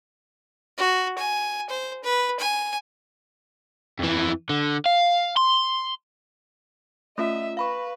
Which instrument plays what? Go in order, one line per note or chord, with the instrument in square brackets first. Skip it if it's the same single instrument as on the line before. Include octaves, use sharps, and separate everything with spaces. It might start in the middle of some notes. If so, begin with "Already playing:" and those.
[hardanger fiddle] F#4
G#5
C5
B4
G#5
[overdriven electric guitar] F2 E3
D3
F5
C6
[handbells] A3 C#4 F4 [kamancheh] D#5 E5
[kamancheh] B4 [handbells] F5 B5 C#6